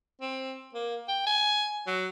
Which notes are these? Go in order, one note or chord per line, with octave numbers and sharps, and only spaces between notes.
C4
A#3
G5
G#5
F#3